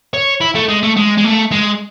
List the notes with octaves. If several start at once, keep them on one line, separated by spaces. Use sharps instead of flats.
C#5
E4
A3
G#3
A3
G#3
G#3
A3
G#3